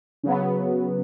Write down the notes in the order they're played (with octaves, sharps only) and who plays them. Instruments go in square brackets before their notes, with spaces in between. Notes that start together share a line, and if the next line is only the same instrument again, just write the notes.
[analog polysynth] C#3 F#3 B3